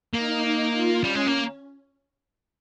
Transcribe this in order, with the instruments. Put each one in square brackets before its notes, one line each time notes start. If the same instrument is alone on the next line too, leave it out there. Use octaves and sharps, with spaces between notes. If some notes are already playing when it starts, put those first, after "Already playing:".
[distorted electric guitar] A#3 [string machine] D#4
[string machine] F4
[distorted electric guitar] G3 [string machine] C#4
[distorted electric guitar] G#3
A#3